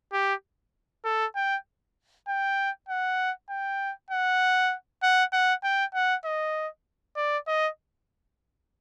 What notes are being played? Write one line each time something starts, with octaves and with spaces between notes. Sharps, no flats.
G4
A4
G5
G5
F#5
G5
F#5
F#5
F#5
G5
F#5
D#5
D5
D#5